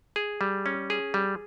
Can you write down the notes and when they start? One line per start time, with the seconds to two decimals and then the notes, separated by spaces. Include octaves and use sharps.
0.16 G#4
0.41 G3
0.66 C#4
0.90 G#4
1.14 G3